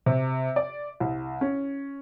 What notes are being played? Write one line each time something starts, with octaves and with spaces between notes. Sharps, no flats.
C3
D5
C2
C#4